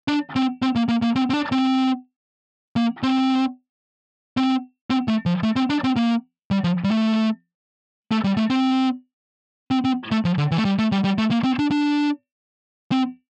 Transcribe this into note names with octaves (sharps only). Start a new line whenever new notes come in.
D4
C4
C4
A#3
A#3
A#3
C4
C4
D4
C4
A#3
C4
C4
C4
A3
F3
A3
C4
D4
C4
A#3
G3
F3
G3
A3
A3
G3
A3
C4
C4
C4
A3
F3
D3
E3
A3
G3
A3
G3
G3
A3
A#3
C4
D4
D4
C4